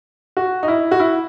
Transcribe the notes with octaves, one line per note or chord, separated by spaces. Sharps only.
F#4
D#4
E4
F#4
E4